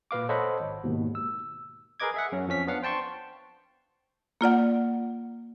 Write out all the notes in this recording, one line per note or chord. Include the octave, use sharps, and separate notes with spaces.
A#2 B4 F5 D6
A4 C5 C#5 D#5 F#5 B5
G#1
D#2 G#2 B2
E6
G#4 A#4 B4 D#5 D6 G#6
G#4 E5 F#5
F#2 C#4 F#4
F2 F3 C#4 B6
B3 D4 F5 F#5 F6
C5 G5 A5 C6 C#6
A#3 F4 D5 F#5